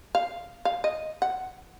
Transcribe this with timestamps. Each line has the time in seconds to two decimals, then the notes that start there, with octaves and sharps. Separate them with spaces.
0.15 F5
0.65 F5
0.84 D#5
1.22 F#5